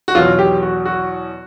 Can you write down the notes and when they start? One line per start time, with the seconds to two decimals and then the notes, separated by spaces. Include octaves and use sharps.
0.08 F#4
0.15 E2 B2 F#3 F4
0.39 G4
0.62 F#4
0.85 F#4